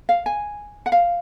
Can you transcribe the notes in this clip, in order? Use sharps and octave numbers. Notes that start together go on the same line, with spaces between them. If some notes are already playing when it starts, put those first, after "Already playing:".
F5
G#5
F#5
F5